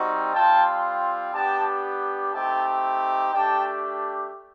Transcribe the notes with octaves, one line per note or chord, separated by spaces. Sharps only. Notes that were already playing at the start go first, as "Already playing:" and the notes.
Already playing: G3 C4 D#4 F#4
G3 C4 F4 G5 A5
B3 D4 G4 G5 A5
A3 C4 D#4 G4 G5 A5
A3 D4 G4 G5 A5